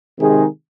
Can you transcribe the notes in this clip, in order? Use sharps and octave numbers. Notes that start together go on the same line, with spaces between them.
C3 D#3 G#3 D#4 G#4